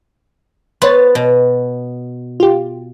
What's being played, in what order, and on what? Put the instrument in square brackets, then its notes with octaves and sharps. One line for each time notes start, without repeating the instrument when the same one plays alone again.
[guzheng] B3 [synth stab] C5 C#5 A6
[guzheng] B2
[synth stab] F4 G4